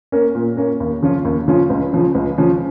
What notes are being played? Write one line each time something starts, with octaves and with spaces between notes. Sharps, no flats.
A#3 C#4 A#4
A#2
A#3 C#4 A#4
D#2
C#3 F3 C#4 F4
D#2
C#3 F3 C#4 F4
C#2
C#3 F3 C#4
C#2
C#3 F3 C#4